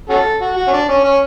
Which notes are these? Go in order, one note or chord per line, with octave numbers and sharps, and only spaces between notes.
C#4 F#4 A4
F#4
F#4
C#4
D4
C#4
C#4